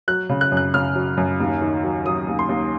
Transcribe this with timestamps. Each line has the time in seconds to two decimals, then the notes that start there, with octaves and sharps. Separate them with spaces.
0.08 F#3 F#6
0.29 C#3
0.41 F#6
0.52 F#2
0.57 F#6
0.74 C#3 F6
0.95 F#3
1.17 F#2
1.40 D#2
1.62 D#3
1.83 F#3
2.05 F#3 D#6
2.28 D#2
2.39 C6
2.49 D#2